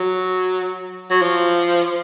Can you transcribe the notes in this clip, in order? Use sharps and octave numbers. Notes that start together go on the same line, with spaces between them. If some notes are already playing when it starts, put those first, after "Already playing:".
Already playing: F#3
F#3
F3